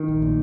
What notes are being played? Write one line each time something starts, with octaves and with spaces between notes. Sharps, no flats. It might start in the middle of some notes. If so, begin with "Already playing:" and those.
Already playing: D#3
A#1
A#2